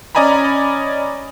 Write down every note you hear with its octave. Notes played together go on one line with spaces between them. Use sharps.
C#4 D5 D#5 G#5 A#5 B5